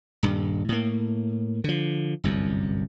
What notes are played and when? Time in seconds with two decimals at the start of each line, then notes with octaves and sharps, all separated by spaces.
0.23 D#1 G2
0.69 A2 A#3
1.64 D3 F3
2.24 G1 C2 F#2